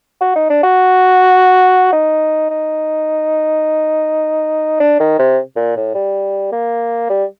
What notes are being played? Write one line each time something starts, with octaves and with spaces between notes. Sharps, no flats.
F#4
D#4
D4
F#4
D#4
D#4
D4
D#3
C3
A#2
A2
G3
A#3
G3